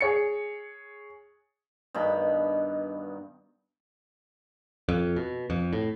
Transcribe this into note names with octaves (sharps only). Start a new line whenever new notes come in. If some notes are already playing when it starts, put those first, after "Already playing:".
G#4 C#5 C#7
G2 B2 D#3 B5
F2
B2
F2
A2